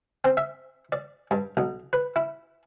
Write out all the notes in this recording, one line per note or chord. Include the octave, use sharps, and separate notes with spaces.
C4
E5
D5
G2
B1
B4
E4